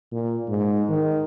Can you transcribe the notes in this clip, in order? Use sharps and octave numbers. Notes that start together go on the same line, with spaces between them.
A#2
G#2
D#3